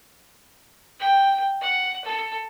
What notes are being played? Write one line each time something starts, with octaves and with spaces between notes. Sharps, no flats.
G5
F#5
A4